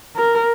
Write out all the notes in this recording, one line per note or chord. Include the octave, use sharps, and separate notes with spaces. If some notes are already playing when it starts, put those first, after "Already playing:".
A#4